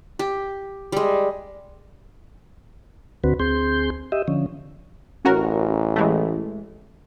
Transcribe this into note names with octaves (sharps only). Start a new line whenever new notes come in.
G4
G3 G#3
D2 D3 C4 F#4 B4
D2 C4 G#4 C6 G6
G4 D#5 E5
D3 F3 C#4
A1 C#4 F#4 A#4
E3 G#3 A3